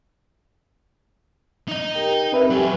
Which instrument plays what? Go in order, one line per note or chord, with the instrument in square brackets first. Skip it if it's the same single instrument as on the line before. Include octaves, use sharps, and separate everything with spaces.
[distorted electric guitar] D#4 D#5
[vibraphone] G4 A#4 G5
[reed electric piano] C4 B4 E5 [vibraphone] D5
[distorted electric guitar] E2 F#3 [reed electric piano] G4 [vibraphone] A4 G#5